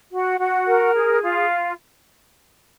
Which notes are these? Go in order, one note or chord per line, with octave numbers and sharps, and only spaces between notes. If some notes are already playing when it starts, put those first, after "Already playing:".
F#4
F#4
A#4
G#4
F4